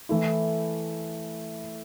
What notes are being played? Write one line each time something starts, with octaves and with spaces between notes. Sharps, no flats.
E3 A3 E4